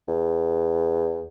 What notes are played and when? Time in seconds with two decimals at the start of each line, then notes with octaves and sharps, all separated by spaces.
0.08 E2